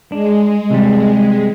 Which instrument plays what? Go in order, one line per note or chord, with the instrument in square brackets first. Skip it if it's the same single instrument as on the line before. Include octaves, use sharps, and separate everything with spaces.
[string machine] G#3 [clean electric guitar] D4
[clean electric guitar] C3 E3 G3